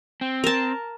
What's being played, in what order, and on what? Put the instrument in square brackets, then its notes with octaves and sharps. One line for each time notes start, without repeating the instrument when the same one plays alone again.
[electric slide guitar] C4
[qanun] A#4 A5